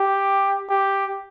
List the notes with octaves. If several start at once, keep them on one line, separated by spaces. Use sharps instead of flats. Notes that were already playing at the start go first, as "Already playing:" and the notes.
Already playing: G4
G4